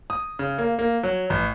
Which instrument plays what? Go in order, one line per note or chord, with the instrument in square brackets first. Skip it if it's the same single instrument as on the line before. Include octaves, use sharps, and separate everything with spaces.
[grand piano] D#6
C#3
A#3
A#3
F#3
A1